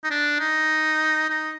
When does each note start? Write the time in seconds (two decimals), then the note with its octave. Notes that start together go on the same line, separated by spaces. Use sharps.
0.04 D#4
0.10 D4
0.40 D#4
1.30 D#4